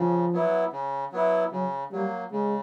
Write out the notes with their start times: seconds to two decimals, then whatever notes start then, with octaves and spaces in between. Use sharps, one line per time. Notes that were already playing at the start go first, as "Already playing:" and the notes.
Already playing: C#3 F3
0.33 F#3 B3 E4
0.73 C#3
1.12 F#3 B3 E4
1.52 C#3 F#3
1.91 F#3 G3 A#3
2.32 C#3 G#3